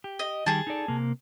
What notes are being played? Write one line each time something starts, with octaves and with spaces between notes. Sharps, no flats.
G4
D#5
D#3 G3 G4 G#4 A5
D#4 A4 D5
C3 A#3